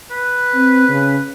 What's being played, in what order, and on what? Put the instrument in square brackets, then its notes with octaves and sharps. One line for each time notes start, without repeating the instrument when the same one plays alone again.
[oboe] B4
[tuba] C4
C#3